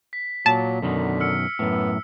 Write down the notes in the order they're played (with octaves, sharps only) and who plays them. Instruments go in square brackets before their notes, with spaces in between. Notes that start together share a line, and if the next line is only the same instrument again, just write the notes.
[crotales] B6
[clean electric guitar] A#2 [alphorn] F#3 [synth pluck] A5
[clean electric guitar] F#2 B2 D#3 [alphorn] D3
[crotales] E6 F6 C#7
[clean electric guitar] F#2 A2 [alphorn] B3